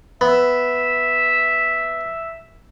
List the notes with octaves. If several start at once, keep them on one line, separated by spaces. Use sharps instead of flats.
B3 E5